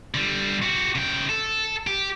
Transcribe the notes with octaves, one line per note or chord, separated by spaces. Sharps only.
D3 G3
F#4 G4
C#3 G5
A4
G4